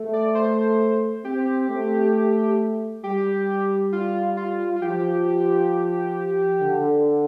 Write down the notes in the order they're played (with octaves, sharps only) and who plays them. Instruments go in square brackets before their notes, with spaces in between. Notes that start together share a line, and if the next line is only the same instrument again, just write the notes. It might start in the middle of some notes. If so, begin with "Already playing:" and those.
Already playing: [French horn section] A3
[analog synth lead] D5
C5
[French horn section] C4 [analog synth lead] G4
[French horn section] A3
[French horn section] G3 [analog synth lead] G4
[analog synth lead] F4
F4
F4
[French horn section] F3 [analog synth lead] G4
[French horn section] D3